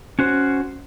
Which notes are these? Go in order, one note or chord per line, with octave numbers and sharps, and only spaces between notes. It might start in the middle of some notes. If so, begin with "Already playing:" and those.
C#4 F#4 C5